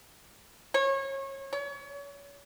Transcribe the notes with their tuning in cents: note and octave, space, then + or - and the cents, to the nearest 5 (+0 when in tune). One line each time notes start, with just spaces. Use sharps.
C#5 -30
C#5 +35